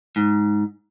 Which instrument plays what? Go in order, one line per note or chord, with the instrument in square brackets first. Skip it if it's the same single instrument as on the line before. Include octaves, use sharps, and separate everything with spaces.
[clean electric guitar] G#2